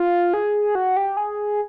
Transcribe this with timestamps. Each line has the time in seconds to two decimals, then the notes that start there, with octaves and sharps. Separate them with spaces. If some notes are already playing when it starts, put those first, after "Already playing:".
Already playing: F4
0.34 G#4
0.75 F#4
0.96 G4
1.17 G#4